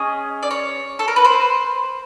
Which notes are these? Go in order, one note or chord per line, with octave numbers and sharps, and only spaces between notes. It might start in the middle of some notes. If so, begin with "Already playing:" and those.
Already playing: C#4 G#4 D#5
D5
C#5
A4
A#4
B4
C5